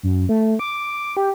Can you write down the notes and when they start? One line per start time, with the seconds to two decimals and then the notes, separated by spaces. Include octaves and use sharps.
0.03 F#2
0.29 A3
0.59 D6
1.17 G4